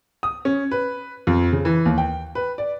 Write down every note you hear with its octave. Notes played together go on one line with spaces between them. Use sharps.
D#6
C#4
B4
F2
C#3
E3
D#2
G5
B4
D5